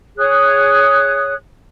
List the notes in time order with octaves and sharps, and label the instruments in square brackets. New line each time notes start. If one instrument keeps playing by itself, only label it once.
[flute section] G#4 C#5 D#6 F#6